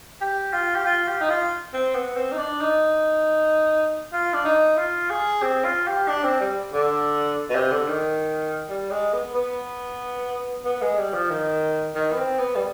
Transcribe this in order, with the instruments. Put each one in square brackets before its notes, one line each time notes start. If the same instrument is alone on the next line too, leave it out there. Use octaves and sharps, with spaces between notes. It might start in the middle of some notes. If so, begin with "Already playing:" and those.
[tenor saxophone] G4
F4
G4
F4
G4
D#4
F4
C4
B3
C4
D#4
D4
D#4
F4
D4
D#4
F4
G#4
C4
F4
G4
D4
C4
G3
D3
B2
C3
D3
D#3
G3
G#3
B3
B3
B3
G#3
G3
F3
D#3
D#3
B3
C4
B3
G3